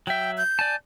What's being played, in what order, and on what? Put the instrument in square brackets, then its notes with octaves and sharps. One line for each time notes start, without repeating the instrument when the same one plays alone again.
[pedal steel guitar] F#3 E5 [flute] G5
[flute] G6
[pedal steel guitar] D5 G#5 A5